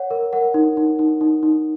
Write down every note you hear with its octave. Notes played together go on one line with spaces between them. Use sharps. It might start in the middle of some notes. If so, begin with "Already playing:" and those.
Already playing: C#5 F#5
A#4
A#4 F#5
D#4
D#4
D#4
D#4
D#4